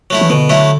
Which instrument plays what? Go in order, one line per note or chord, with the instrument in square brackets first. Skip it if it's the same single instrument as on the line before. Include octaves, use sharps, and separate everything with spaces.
[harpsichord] F#3 A3 E4
[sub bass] E3
[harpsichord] B2 [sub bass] D3
[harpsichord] F#3 A3 E4